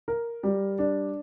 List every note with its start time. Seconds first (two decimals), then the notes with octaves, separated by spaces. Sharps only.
0.08 A#4
0.43 G3
0.78 D4